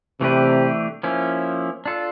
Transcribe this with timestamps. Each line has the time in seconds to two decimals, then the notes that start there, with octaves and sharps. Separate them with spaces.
0.21 C3 E3 A3 D4 G4 B4
1.03 F3 A#3 C#4 E4
1.86 D4 F4 A4